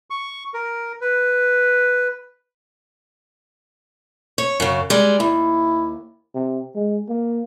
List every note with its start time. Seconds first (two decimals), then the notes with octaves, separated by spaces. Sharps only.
0.10 C#6
0.54 A#4
1.01 B4
4.38 C#5
4.60 F#2 C#3
4.90 G3 G#3
5.20 D#2 E4
6.35 C3
6.75 G#3
7.09 A#3